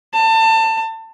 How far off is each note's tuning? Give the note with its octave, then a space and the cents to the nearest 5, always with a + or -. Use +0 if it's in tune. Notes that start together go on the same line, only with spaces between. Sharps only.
A5 +25